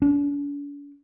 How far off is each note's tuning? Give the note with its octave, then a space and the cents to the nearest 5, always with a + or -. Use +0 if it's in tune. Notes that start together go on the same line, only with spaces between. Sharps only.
D4 -45